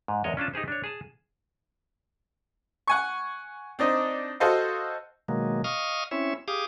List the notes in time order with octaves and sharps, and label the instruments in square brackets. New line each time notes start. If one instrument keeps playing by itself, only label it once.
[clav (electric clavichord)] G#2
E2 G#3 A#4 C#5 D#5
C#4 D4 F4 A5
D#4 G4 G#4 C5
D4 C#5
G#4 A5
[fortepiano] F#5 G#5 C#6
C4 D4 D#4
F#4 A4 C5 D#5 F5
[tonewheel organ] B2 D#3 F#3 G#3 A#3
D#5 F5 C#6 D#6 F6
C4 C#4 E4 C#5 E5
G4 G#4 F5 D6 D#6